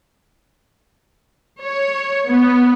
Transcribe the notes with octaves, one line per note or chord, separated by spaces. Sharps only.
C#5
B3